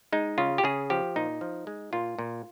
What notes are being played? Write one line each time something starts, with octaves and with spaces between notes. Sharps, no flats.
G#3 D#4
C#3 F4
G4
C#3 G#4
F3 G4
A#2 D#4
F3
G#3
A#2 F4
A#2